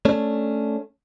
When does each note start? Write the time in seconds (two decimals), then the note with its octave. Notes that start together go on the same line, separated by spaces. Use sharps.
0.05 A3 C#4 D4